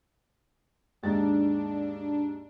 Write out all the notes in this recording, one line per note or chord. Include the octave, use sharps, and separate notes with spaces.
D#2 G#2 D4 A6